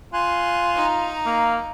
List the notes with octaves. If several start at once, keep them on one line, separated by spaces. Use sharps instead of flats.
F4 G#5 C6 F#6
D#4 A#5
A#3 F5